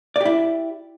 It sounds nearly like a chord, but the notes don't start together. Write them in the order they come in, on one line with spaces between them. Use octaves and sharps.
D5 G4 E4